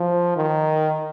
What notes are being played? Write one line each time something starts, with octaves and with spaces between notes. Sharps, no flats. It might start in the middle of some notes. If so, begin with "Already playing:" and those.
Already playing: F3
D#3